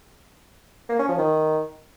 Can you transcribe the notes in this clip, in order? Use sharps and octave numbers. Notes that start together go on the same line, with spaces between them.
A#3
C#4
F3
D#3